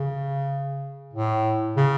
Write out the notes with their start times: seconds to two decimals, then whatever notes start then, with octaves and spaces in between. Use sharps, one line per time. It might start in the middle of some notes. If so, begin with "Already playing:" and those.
Already playing: C#3
1.13 A2
1.77 C#3